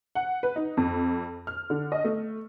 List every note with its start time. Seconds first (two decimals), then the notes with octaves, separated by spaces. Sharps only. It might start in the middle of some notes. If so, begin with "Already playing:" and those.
0.15 F#5
0.43 B4
0.56 D#4
0.77 F2
1.47 F6
1.70 D3
1.92 D#5
2.04 A3